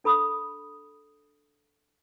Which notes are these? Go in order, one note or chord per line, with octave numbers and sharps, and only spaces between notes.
D4 A4 B5 D#6